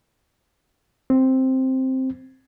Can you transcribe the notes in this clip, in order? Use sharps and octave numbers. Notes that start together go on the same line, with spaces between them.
C4